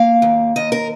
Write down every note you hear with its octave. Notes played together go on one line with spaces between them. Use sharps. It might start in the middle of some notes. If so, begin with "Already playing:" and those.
Already playing: A#3 F5
D#2
D#2 D#5
A#4